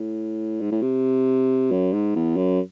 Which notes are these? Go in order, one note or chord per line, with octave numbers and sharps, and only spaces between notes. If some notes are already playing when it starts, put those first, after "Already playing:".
Already playing: A2
G#2
A2
C3
F#2
G#2
E2
F#2